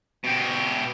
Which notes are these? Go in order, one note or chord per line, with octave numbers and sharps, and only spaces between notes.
B2 G4